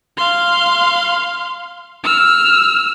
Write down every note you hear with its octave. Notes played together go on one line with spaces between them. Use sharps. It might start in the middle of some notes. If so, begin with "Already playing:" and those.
F5 C6
E6 F6